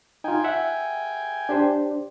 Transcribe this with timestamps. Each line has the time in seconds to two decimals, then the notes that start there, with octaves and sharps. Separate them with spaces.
0.24 D#4 F4 G5 G#5
0.44 E5 F#5
1.49 D4 G4 C5